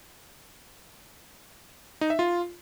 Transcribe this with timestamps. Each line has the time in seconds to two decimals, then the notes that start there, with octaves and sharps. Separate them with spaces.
2.01 D#4
2.10 E5
2.19 F4